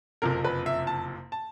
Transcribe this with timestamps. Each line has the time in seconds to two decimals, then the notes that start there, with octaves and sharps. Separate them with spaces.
0.22 F#1 F2 C3 A#4
0.44 B4
0.66 E5
0.87 A5
1.32 A5